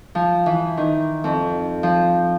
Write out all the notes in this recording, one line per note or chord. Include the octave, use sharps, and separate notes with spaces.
F3
E3
D#3
F2
F3